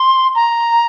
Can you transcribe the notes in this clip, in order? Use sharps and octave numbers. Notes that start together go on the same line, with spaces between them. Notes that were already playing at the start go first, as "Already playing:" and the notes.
Already playing: C6
A#5